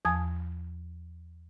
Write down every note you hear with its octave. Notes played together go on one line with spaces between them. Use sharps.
E2 F3 G#5 A5 D#6 G#6